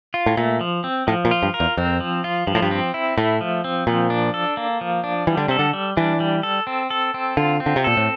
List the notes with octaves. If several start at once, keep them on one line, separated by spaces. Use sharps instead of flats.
F4
A2
A#2 A3
F3
C4
A2 F3
A#2
F4
G2
A#4
E2
F2 C4
F3
F4
G2 F3
A2
G2
C4
E4
A2 A3
F3
C4
A#2 F3
D4
A4
A#3
F3
D4
E3 G3
D3
C3 A4
D3
G3
E3 D4
G3
A4
C4
A4
C4
D3 F4
C4
D3
C3
A#2 A4
A2